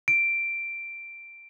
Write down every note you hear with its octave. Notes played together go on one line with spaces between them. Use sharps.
D7